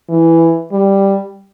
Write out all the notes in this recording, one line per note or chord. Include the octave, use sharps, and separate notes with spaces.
E3
G3